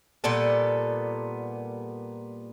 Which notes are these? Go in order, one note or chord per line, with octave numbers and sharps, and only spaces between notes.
A#2 G3 B3 A4